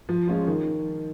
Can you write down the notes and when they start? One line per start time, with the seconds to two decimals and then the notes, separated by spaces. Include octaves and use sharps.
0.09 F3
0.28 G#3 C#4 F4
0.47 D#3